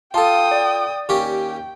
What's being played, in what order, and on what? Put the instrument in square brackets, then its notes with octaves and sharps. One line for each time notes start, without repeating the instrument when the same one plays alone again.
[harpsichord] F4 A4 [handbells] F5 A5 [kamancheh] G5 D#6
[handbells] D5
[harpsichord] D#2 C#4 G4 [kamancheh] G5